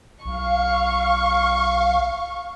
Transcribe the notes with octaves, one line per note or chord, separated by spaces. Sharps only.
B1 F5 C#6